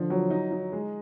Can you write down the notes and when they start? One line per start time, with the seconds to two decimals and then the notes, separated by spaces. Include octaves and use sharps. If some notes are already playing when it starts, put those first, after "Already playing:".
Already playing: D3 F3
0.10 F#3
0.30 D#4
0.52 D#4
0.72 G#3